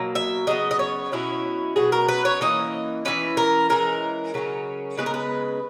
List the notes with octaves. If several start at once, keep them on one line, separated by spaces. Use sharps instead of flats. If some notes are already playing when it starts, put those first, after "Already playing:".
Already playing: B2 F#3 A#3
E5
C#3 F#3 B3 D#5
D#5
C#5
B2 F#3 C#4 E4
B2 F#3 C#4 G#4
A#4
B4
C#5
E3 A#3 C#4 D#5
E3 A#3 C#4 B4
A#4
E3 G#3 C#4 A#4
C#3 F#3 C#4
C#3 G#3 B3 B4
A#4
B4